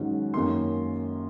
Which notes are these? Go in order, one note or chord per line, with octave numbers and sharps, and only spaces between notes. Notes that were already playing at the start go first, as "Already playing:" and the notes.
Already playing: G#2 D#3 F#3 C#4
F#2 D#3 A#3 C#4 C6